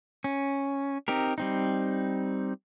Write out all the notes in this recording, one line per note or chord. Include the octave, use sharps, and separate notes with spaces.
C#4
C4 D#4 G4 A#4
G3 C4 D#4